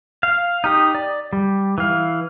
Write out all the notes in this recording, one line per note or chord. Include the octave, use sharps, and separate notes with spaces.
F5
D#4 G4 D#6
D5
G3
E3 F5